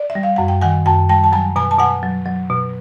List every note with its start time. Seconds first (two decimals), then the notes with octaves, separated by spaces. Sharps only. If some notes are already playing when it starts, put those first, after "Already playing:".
Already playing: D5
0.10 E5
0.15 G3
0.23 F5
0.36 F#2 F#5
0.48 G5
0.61 D#3 F#5 G#5
0.86 F#2 G5 A5
1.09 G3 G5 A5
1.24 A5
1.32 F#3 G#5 A#5
1.56 B2 G#5 A#5
1.71 A5
1.79 B2 F#5 G#5
2.03 F#3
2.26 F#3
2.50 B2